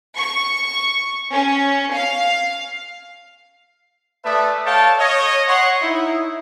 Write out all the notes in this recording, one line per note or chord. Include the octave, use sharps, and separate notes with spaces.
C#6
C#4
F5
A3 B4 D5 E5 A5 D#6
A4 C#5 F5 G5 A5
C#5 D#5
C#5 F#5 C6
D#4 E4